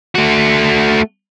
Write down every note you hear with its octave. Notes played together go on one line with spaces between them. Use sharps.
A3 F#4